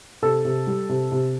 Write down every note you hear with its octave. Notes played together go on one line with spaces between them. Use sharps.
C3 A4
C3
G3
C3
C3